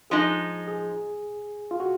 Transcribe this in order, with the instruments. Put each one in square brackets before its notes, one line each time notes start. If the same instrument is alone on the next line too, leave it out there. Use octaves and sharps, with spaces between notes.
[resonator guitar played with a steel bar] F3 G#3 D#4 [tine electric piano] G#4
[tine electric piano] G#4
F4
F#4